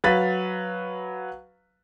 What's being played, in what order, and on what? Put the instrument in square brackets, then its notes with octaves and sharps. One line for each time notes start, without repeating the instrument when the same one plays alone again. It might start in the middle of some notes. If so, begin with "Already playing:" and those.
[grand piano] F#3 B4 F5 A6 B6